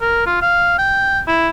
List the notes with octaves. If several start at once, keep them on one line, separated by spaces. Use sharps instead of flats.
A#4
F4
F5
G5
E4